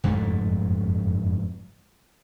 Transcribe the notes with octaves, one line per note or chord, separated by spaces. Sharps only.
F#1 F2 G#2 A3